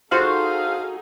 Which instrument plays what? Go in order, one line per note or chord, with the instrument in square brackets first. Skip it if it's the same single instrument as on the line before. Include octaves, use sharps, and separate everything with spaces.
[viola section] D#4 G#4 A4 [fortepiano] F4 C5 [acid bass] F#4 [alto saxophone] F5